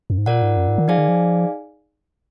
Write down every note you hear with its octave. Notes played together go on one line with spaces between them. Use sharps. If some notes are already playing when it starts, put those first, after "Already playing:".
F#2
G#2
A#2 F4 A#4 D5 F#5
G#2
F#2
G#2
D#3
F3 D#4 G#4 D5 F5 G#5
D#3
F3